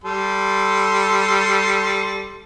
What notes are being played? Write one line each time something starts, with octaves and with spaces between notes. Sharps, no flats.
G3 A4 C6